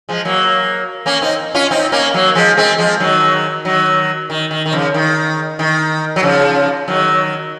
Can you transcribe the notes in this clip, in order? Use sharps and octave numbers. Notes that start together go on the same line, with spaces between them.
F3 G#3
F#3 A#3
A#3 C#4
C4 D#4
C#4 F4
C4 D#4
A#3 C#4
F#3 A#3
F3 G#3
G#3 C4
F3 G#3
D#3 F#3
D#3 F#3
D#3
D#3
D#3
C#3 F3
D#3
D#3
F#3
C#3 F3
D#3 F#3